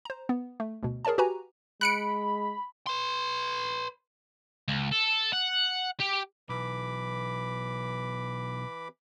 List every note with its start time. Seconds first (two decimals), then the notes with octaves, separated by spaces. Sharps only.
0.05 C5 A#5
0.29 B3
0.60 A3
0.83 D2 B2
1.05 G#4 A#4 C#5 D5 A5
1.18 F#4 G4 B4 G#5 A#5
1.81 G#3 B5 F#6 C#7 D7
2.87 B4 C6
4.68 C#2
4.92 A4
5.33 F#5
6.00 G4
6.49 B1 E3 B5 D6